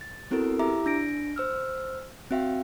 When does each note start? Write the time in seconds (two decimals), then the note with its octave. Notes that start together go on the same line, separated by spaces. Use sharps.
0.01 A6
0.31 B3 C4 E4 F#4 A4 A#4
0.59 E4 G4 E5 A#5 D6
0.86 D4 A#6 D7
1.36 C5 E6 F6
2.31 C4 F#4 E5 F5 G5